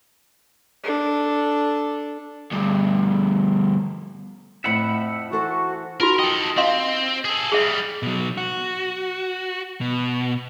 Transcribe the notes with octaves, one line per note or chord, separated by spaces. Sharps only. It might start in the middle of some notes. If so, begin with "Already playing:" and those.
D4 A4
D2 G2
F2 A2 F3 E5 F#5 B5
E3 F#4 A4 C5
D#4 F4 F#4 A#4
A4 D#5 G5
C4 D#5 F5 C6
G#4 A4
G3 G#3 G#4 E5
B2 F#3
F#4
B2